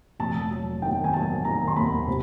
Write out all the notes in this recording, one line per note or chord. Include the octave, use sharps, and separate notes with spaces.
F1 A5
F#3
D#3 G5
G#5
F#3 A5
D#3 A#5
C6
D#2 B5
C3